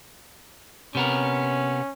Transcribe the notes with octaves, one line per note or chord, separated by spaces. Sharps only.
C3 B3 C#4 A#4